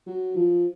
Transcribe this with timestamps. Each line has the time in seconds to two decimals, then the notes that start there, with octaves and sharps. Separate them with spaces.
0.07 F#3
0.36 F3